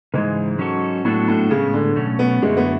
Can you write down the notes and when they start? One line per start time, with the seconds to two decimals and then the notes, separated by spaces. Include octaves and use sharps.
0.14 G#2 C#3 E3 G#3
0.59 F#3 C#4 F#4 A4
1.05 A2 F#3 B3 D4 F#4 A4
1.28 A2
1.50 A2 C#3 G#3 B3
1.74 D3
1.96 B2 F#3 A3 C#4
2.19 B3
2.42 F#2 D3 F#3 G#3 A3 E4
2.57 B3